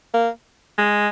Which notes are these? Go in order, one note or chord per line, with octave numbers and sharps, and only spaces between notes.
A#3
G#3